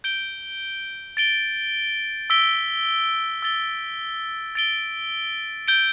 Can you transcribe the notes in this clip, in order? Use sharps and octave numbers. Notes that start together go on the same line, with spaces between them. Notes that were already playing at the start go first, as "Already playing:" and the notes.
G6 D7 G7
A6 D7 G7
E6 B6 D7 G7
E6 A6 G7
A6 D7 G7
G6 D7 G7